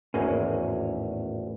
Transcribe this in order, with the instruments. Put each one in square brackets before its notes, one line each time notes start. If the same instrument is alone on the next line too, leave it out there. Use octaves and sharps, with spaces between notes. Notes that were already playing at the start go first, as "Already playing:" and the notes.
[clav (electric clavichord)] G#1 E2 G#5 [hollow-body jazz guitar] A2 A#3 C#4